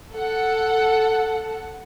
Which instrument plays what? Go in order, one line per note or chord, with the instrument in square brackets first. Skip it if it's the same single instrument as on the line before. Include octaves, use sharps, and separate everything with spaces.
[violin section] A4 F#5